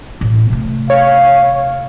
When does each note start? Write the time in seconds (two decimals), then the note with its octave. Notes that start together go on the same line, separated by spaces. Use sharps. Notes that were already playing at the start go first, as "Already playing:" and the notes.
0.21 A1
0.50 C3 A3
0.90 C#5 F5